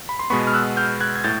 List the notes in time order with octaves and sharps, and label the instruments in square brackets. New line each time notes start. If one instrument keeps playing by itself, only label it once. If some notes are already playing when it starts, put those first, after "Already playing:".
[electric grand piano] B5
C6
B2 G#3 B3 B5 C#6
F6
E6 F#6
F6 G6
F#6 G#6
G#6
A2 G6 A6